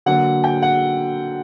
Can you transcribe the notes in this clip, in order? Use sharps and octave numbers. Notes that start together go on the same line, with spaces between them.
D3 F#3 A#3 F#5
G5
F#5